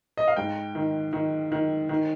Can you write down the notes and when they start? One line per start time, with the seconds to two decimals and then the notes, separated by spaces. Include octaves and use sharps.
0.17 D#5
0.28 F5
0.36 G#2 G5
0.75 D#3
1.13 D#3
1.52 D#3
1.89 D#3